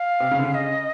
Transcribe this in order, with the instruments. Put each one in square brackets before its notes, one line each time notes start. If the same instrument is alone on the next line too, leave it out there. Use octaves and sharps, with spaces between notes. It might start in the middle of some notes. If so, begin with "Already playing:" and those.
Already playing: [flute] F5
[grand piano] C3
C#3
D3
C#3
[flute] D#5